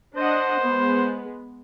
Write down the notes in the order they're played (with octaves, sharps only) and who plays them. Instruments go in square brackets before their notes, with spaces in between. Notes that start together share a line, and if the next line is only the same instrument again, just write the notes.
[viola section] D4 D#5 F#5 [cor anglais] C5
[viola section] G#3 B3